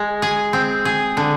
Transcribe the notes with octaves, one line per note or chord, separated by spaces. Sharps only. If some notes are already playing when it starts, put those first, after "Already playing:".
Already playing: G#3
G#4
C4
G#4
D3